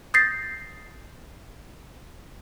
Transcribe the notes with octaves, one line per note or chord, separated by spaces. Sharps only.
D#6 G6 A6 A#6 C7